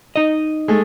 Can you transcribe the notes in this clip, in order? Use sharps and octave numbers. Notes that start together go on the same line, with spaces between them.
D#4 D#5
G#3 A3